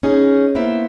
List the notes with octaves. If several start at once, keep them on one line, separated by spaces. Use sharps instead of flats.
C#4 D#4 G#4
A#3 B3 E4 C5 E5